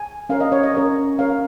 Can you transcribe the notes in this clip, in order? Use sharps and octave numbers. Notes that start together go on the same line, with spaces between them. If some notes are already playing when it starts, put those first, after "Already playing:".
Already playing: G#5
C#4 A#4 C#5 F5
D#5
C#5
D#5
C#4 A#4 C#5
C#4 A#4 C#5 F5